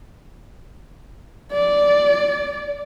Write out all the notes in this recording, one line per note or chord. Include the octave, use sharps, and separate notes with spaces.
D5